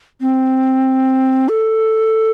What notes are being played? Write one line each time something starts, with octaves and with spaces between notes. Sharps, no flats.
C4
A4